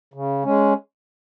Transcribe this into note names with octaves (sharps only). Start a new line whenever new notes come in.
C#3
G#3 C#4